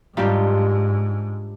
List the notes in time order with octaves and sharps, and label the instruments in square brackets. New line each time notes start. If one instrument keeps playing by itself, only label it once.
[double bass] G#2 [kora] G3 D#4 F4 [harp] C4 D4 G4